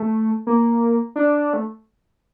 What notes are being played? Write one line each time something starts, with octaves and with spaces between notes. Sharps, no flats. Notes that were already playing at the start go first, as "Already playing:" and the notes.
Already playing: A3
A#3
D4
A3